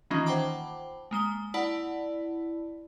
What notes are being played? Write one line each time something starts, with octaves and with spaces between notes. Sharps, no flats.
D#3 E3 A#3 C#4 D#4 F4
C5 F#5 G5 A5 B5 D6
G#3 A#3 D#6 G7
E4 D5 F#5 A5 B5